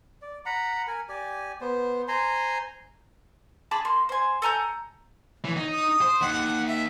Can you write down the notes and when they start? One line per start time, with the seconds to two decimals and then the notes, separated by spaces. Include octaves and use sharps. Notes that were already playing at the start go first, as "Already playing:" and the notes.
0.22 D5
0.46 F#5 A#5 B5
0.88 A#4 G#5
1.09 G4 D5 G#5
1.61 B3 C5
2.08 C5 G#5 A#5 C6
3.71 G#4 A5 B5 D6
3.85 A#3 C6
4.09 C5 G#5
4.42 A4 G#5 A#5 G6
5.45 E3 C#5
5.57 D#4
5.72 D#6
6.02 C5
6.21 D#2 F#5
6.67 E5